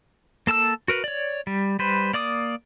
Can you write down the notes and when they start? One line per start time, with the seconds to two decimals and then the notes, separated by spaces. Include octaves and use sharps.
0.47 A#3 A4 A5 E6
0.88 F#4 A#4 B4
1.04 C#5 D5
1.47 G3
1.79 G3 B4 C5
2.13 A#3 D5 D6 D#6